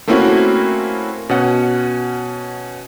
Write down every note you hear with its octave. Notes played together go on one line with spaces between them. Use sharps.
A3 A#3 C4 C#4 E4 F#4
B2 C#4 F#5